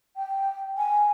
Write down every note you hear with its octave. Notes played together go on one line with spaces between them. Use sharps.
G5
G#5